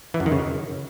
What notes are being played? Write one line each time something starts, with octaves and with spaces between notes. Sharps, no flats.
E3
F#2
D#3
C#3